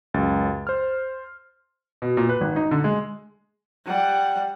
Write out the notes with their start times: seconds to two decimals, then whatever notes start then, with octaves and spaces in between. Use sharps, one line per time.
0.14 C#2 F#2 A6
0.67 C5 F6
2.02 B2
2.17 A#2
2.29 B4
2.41 G#1
2.56 D#4
2.71 D3
2.84 G#3
3.86 G3 F#5